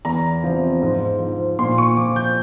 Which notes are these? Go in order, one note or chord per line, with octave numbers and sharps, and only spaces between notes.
E2 A#5
C3 F3
G#2
F3
A#2 C6
C#6
F3 D6
G6